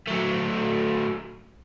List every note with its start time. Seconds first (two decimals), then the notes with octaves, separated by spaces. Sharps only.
0.07 F#3 A3